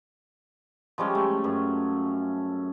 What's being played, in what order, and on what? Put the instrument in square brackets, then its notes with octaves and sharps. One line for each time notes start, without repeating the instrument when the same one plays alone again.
[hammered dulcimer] F3 G3 G#3 C#4
A3
F#2